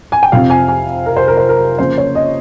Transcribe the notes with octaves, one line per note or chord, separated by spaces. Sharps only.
G#5
G5
F2 C3 F3 C4 F5
G#5
G#5
A#4
C5
A#4
C5
A#4
C#3 F3 A#3 C5
C#5
D#5